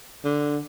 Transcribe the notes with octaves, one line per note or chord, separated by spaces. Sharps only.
D3